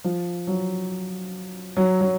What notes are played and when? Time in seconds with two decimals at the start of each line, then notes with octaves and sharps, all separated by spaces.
0.04 F3
0.47 F#3
1.77 F#3
2.01 F#3